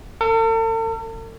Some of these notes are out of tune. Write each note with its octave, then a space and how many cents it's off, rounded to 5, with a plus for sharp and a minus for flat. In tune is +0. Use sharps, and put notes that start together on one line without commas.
A4 +45